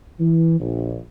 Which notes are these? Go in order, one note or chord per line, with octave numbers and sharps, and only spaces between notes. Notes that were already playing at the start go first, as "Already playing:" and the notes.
E3
A#1